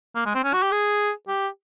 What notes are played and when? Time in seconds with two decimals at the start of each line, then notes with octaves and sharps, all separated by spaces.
0.15 A#3
0.26 G#3
0.35 C4
0.44 C#4
0.53 F#4
0.63 G4
0.71 G#4
1.28 G4